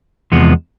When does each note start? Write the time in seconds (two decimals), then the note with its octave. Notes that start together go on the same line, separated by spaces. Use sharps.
0.32 E2 C3 F3 G#3 B3